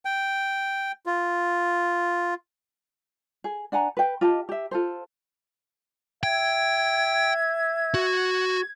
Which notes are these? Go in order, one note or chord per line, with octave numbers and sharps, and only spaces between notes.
G5
F4
G#4
D4 F#5 G#5 A#5
B4 G5
F4 G4 D#5 A5
G4 E5
F4 A4 C5
E5 G5 G#6
F#4